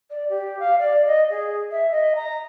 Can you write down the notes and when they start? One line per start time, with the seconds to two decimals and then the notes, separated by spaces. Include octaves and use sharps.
0.11 D5
0.30 G4
0.60 F5
0.79 D5
1.06 D#5
1.31 G#4
1.72 E5
1.91 D#5
2.16 A#5